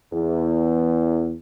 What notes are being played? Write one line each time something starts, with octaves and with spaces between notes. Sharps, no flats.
E2